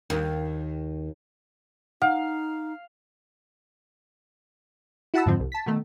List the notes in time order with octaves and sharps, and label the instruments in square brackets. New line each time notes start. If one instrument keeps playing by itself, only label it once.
[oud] D#2
[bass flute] D#4 [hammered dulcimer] F5 [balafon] F#5
[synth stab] E4 F#4 F#5 A5 B5 E6
F2 G#2 D3 F3 C4
C2
A5 B6
B2 D#3 A3